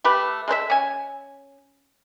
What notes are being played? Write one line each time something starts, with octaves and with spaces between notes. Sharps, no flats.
A3 G4 B4
G#3 A4 C5 E5
C#4 G#5